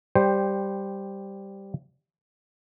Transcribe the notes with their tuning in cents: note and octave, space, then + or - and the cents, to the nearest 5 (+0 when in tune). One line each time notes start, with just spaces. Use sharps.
G3 +0 C5 +0 G5 +15